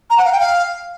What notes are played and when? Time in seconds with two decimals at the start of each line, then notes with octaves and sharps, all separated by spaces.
0.10 A#5
0.18 F#5
0.25 F5
0.32 G5
0.40 F5